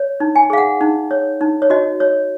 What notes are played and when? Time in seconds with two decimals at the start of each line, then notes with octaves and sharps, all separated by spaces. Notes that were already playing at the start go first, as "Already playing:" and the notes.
Already playing: C#5
0.20 D#4
0.35 G#5
0.50 G#4 F5
0.58 F#5
0.81 D#4
1.11 C#5
1.41 D#4
1.62 C#5
1.70 F#4 D#5
2.00 C#5